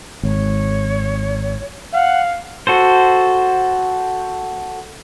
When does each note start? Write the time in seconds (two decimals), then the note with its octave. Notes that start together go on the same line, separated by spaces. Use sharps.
0.23 G#1 C#5
1.94 F5 F#5
2.67 F#4 A4 C5